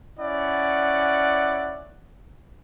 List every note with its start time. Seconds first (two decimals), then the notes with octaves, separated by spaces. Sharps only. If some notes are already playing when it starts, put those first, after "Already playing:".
0.19 C#4 E4 D5 F#5